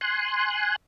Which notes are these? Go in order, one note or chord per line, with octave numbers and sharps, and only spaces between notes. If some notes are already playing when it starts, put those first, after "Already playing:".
G#5 C6 F#6